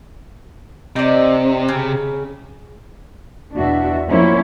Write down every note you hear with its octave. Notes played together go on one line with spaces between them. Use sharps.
C3 C4 D#4 D5
C#3
E2 B2 D4 F#4 E5
F3 A#3 C#4 E4 C5 C#5